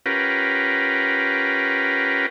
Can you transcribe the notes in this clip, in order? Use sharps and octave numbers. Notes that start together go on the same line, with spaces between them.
C#4 F4 G4 A#4 B4 F#5